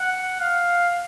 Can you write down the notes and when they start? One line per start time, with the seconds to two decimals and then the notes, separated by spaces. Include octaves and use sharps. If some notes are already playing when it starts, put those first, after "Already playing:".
Already playing: F#5
0.40 F5